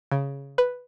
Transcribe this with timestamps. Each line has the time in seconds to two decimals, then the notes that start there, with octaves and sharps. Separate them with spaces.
0.11 C#3
0.58 B4